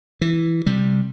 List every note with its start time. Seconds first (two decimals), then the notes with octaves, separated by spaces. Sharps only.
0.21 E3
0.66 C3 G3